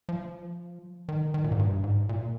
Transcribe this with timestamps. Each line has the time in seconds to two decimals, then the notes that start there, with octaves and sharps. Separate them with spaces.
0.09 F3
1.09 D#3
1.34 D#3
1.44 A#2
1.52 G#2
1.59 G2
1.84 G#2
2.09 A#2